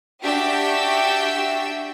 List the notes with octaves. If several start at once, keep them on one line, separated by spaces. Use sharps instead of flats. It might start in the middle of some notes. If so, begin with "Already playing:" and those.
D4 F#4 G4 E5 G5 E6